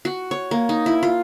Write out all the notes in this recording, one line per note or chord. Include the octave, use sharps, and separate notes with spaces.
F#4
C#5
A#3
D#4
E4
F4